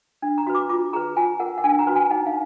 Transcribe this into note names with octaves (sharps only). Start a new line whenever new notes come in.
D4
A#5
F#4 B4
D6
F4 D6
G#4 B4 A#5
F4 G#5
A#4 F#5
F#5
D4 G#5
A#5
F#4 B4
G#5
D#4 F#5
F5